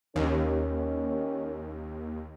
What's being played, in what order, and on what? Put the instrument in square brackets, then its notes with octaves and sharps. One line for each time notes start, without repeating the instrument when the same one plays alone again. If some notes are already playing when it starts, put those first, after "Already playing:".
[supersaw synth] D#2 [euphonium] D#3 [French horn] C#4